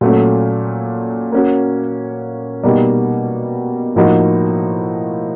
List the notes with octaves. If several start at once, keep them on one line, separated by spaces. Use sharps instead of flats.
A#2 F#3 A3 C#4
A#3 C#4 F#4
B2 G3 A#3 D#4
A2 F3 A#3 D#4 F#4